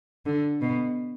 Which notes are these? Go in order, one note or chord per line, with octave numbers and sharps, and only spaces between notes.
D3
B2